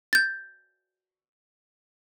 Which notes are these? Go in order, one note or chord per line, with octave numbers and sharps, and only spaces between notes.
G6 A6